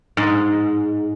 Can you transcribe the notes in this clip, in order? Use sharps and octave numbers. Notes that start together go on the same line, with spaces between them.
G#2